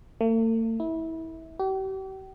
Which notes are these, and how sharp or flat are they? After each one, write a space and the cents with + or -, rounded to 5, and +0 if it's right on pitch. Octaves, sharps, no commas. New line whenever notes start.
A3 +45
E4 -25
G4 -40